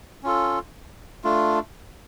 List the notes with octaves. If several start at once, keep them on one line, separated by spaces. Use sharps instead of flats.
C#4 F4 A4
A3 D4 F4